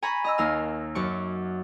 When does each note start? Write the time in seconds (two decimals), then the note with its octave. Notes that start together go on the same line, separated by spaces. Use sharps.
0.02 G#5 A#5 B5 C#6
0.24 D#5 A#5 E6
0.38 D#2 A#4 F5 E6
0.95 F#2 F#3 C#6 D6